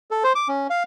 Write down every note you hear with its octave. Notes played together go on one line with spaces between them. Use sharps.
A4
C5
D6
C#4
F5